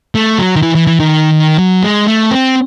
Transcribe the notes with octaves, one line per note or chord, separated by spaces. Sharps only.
A3
F#3
D#3
E3
E3
E3
D#3
F#3
G#3
A3
C4